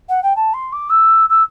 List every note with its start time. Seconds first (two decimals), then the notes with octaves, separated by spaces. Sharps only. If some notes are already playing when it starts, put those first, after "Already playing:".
0.08 F#5
0.22 G5
0.35 A5
0.53 C6
0.72 D6
0.89 E6
1.29 E6